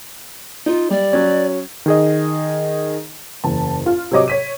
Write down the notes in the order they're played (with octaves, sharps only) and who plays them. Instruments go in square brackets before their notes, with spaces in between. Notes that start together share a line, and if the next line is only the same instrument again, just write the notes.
[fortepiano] D#4 [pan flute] F4
[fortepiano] G3 [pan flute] D5
[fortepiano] F#3 C#4
[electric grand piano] D#3 G#4 D#5
[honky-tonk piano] F#1 E2 A5
F4
C3 F#3 C#5 D#5 D6
C#5 B6 D#7